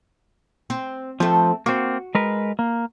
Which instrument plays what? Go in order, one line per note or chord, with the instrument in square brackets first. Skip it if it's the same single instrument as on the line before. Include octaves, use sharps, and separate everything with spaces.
[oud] C4
[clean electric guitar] F3 [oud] A3 C4
[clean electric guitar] A#3 C4 [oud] F#4
[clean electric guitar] G#3 A#4 B4
A#3